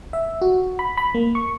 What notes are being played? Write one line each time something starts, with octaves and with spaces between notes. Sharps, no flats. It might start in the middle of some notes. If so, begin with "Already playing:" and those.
E5
F#4
B5
B5
A#3
C#6